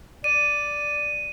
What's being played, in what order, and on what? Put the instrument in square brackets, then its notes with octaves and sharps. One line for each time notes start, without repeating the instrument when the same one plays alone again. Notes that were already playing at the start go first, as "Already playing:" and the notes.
[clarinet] D5 [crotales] D#7